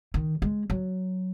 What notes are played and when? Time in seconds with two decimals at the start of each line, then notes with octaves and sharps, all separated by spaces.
0.14 D#3
0.42 G#3
0.70 F#3